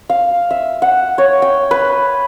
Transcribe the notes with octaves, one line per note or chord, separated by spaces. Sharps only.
F5
E5
F#5
C#5
G5
B4